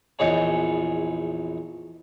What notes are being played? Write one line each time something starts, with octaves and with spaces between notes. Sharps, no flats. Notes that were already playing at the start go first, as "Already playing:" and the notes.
A#1 E2 D#4 G#4 C#5 A5